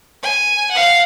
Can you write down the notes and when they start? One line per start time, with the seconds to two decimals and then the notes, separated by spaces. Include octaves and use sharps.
0.23 G#5
0.71 F5 F#5